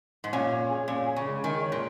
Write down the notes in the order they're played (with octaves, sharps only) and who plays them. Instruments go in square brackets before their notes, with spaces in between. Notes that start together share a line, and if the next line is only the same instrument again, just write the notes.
[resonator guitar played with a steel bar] G#2
[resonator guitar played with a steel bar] A#2 [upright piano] C#4
[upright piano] C#5
G#4
[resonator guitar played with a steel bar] A#2 [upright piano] C#4
[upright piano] G#4
[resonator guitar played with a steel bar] C#3
[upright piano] G#3
[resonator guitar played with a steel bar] D#3 [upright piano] G#4
[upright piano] C#5
[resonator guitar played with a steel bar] A#2